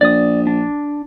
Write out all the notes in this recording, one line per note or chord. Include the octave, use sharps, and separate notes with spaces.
A#1 D5 D#6
D4